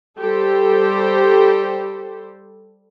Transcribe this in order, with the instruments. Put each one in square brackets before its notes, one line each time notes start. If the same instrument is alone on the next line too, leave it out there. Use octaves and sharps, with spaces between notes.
[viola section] G3 G4 A4 C5